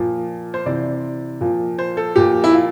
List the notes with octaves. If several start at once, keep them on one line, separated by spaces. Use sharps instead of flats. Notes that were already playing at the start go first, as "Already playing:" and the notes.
Already playing: A#2 F3
C5
C3 E3 D5
A#2 F3
C5
A4
A#2 F3 G4
E4
F4